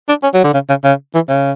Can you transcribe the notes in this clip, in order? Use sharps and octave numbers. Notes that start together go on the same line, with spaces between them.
D4
C#4
F#3
D3
C#3
C#3
C#3
E3
C#3